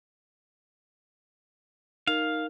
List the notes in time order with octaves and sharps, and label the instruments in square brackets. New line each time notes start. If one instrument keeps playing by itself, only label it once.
[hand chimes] D#4 A#4 [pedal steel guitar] F5